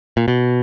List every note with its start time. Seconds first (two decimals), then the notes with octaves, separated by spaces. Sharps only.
0.17 A#2
0.28 B2